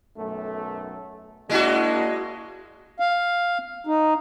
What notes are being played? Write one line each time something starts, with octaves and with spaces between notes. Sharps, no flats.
B1 F#2 A3
G#3 A#3 D4 E4 F#4 D#5
F5
D#4